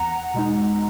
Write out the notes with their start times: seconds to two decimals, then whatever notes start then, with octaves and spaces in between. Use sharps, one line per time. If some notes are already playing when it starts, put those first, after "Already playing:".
Already playing: E2 F#5 A#5
0.34 B2 G#3 D#4